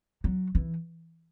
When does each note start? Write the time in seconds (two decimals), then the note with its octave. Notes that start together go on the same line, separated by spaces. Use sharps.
0.24 F#3
0.55 E3